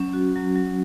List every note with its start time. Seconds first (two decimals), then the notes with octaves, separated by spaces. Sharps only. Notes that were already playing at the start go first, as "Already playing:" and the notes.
Already playing: F#3 C#4
0.13 F#4
0.36 F#3
0.56 F#3